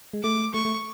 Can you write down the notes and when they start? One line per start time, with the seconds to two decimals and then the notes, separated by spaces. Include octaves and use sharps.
0.13 G#3
0.23 A3 D6
0.54 A3 C#6
0.65 A3